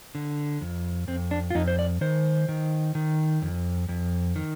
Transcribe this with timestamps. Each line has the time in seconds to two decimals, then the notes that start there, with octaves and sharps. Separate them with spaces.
0.15 D3
0.61 F2
1.08 F2 C4
1.31 D4
1.50 F4
1.55 F2 D#4
1.68 C5
1.79 D5
2.01 D#3 C5
2.49 D#3
2.95 D#3
3.42 F2
3.88 F2
4.36 D#3